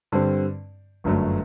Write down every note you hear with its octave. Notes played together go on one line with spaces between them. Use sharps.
G2 D3 G3 C4
G1 F#2 D3 F#3 A3